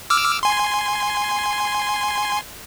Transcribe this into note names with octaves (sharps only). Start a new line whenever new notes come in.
D6 E6 F6
G#5 C6